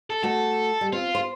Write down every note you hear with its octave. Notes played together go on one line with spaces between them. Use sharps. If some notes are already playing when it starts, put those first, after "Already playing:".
A4
A3 F#4 A4
G3
C4 F4
C5